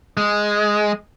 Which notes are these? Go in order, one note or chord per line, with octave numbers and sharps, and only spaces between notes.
G#3